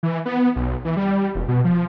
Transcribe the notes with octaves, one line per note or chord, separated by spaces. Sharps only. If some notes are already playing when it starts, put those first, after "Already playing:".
E3
B3
B1
E3
G3
E1
B2
F3